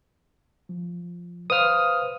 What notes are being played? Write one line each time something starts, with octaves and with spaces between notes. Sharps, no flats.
F3
B4 C5 F5 D#6 F6